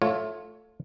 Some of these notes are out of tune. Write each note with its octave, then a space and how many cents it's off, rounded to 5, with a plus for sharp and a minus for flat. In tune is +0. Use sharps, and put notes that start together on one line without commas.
A3 +0 F4 +20 C#5 +0